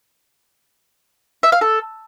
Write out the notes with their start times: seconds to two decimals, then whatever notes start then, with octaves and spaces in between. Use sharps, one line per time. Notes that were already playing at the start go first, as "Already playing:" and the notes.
1.43 E5
1.52 F5
1.61 A4